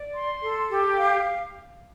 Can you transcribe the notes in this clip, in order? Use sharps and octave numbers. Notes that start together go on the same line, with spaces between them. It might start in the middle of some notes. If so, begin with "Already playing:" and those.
Already playing: D5
C6
A4
G4
F5